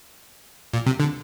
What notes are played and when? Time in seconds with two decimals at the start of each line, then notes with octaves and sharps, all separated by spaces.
0.74 A#2
0.86 C3
1.00 D3